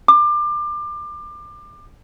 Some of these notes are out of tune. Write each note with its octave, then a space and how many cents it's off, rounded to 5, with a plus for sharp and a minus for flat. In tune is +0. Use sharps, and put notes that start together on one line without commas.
D6 +30